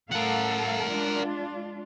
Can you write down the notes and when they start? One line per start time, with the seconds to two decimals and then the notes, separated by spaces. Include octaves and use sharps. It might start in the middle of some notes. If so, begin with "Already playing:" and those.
0.12 A2 A4 A#4 F5 F#5
0.88 G#3 D4 F4